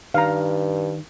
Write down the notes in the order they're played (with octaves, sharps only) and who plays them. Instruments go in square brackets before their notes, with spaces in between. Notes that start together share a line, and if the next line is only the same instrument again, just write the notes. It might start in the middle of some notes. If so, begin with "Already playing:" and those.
[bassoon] G2 [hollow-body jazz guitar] D#3 [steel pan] F5 A#5